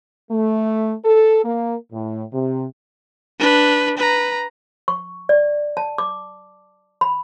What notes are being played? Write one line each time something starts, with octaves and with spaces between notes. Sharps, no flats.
A3
A4
A#3
A2
C3
D4 B4
B4 A#5
C#6
D5
A5
D6
B5